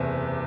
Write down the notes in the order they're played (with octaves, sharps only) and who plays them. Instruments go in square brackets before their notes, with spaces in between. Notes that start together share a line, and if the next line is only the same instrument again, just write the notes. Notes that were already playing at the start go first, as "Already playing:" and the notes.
Already playing: [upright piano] F#1 E2 C3